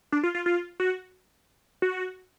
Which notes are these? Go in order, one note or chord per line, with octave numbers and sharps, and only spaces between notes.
D4
F4
F4
F4
F#4
F#4